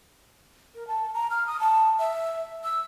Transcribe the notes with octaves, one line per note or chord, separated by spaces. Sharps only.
A#4
A5
A#5
F6
D#6
A5
E5
E6